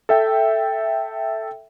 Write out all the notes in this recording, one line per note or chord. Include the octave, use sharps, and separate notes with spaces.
A4 E5 G5